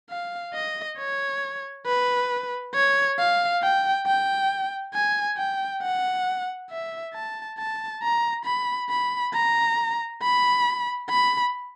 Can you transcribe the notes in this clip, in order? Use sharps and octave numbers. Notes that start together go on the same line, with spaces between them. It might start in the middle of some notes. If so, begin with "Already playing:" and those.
F5
D#5
C#5
B4
C#5
F5
G5
G5
G#5
G5
F#5
E5
A5
A5
A#5
B5
B5
A#5
B5
B5